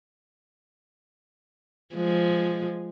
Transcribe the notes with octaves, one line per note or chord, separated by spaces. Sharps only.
F3 G#3